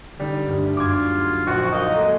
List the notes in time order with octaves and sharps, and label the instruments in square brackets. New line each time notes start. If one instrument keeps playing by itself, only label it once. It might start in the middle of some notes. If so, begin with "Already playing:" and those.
[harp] D3 D#4 [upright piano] G3
[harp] D2 G2 B3
[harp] F#2 [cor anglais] F4 [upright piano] D6 G#6
[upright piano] A#1 [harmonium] F3 [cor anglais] F#4 [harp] C#6 F#6 D#7
[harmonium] A#3 D#5 [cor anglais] D#4
[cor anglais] G#3 [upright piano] A3